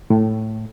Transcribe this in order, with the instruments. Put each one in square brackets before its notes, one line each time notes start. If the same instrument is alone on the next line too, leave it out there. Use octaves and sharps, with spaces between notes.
[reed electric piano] A2